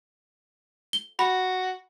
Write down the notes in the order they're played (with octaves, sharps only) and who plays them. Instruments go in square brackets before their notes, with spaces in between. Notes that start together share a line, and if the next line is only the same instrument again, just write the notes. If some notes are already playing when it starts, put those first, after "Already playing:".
[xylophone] G7
[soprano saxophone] F#4 [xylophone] B5